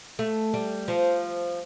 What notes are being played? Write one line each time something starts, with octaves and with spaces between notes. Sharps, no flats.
A3
G3
F3